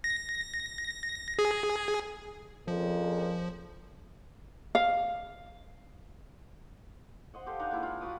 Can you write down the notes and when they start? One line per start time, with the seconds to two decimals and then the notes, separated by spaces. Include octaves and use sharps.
0.04 A#6
1.39 G#4
2.68 F2 A#2 C#3 F3
4.75 F5
7.34 C5 D#5 F#5
7.46 G4 A4 C5 F5
7.59 D4 D#4 F#5
7.71 G#3 A#3 E4
7.83 F4
8.01 F#4 B4 D6 D#6